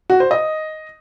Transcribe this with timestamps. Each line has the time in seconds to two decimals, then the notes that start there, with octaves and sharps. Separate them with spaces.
0.10 F#4
0.20 C5
0.31 D#5